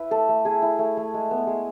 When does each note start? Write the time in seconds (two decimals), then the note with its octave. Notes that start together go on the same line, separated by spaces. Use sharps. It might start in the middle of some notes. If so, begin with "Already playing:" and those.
Already playing: E4 B4
0.11 A3 A4
0.29 A3
0.45 E4 G#4
0.62 E4
0.79 A3
0.97 A3
1.14 G#3
1.31 B3
1.47 G#3